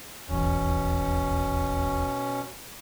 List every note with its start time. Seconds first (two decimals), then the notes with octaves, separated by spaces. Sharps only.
0.29 D#1 G#1 E2 B2 C#4